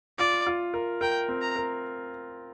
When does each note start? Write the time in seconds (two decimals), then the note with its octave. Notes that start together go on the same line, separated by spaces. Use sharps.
0.19 F4 D5
0.47 F4
0.74 A#4
1.01 A#4 G5
1.29 C4
1.42 A#5
1.56 A#4